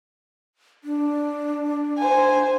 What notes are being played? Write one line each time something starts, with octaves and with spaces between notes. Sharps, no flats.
D4
C5 G#5